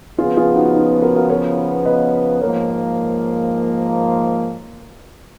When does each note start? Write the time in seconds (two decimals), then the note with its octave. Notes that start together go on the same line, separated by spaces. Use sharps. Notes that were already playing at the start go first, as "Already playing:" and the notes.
0.18 C#3 F3 B3 F4 G#4
0.37 F4 G#4
0.55 D#4 F#4
0.74 D#4
1.02 F#4 A#4
1.16 F#4 A#4
1.29 A#4 C#5
1.85 B4 D#5
2.41 G#2 F3 A#3 A#4 C#5